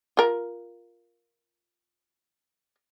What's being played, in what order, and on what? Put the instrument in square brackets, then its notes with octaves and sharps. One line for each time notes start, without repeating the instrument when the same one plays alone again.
[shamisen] F4 A#4